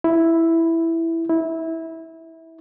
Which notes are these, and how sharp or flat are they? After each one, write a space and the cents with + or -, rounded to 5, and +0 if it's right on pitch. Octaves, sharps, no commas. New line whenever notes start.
E4 +0
E4 -20